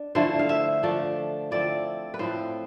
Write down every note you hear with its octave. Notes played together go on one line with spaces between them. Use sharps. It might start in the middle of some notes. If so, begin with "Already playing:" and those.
Already playing: D4
D3 F3 A3 E4 C5
F5
E5
F3 A3 D4
F3 C4 E4 D5
B4
A2 F3 C4 C5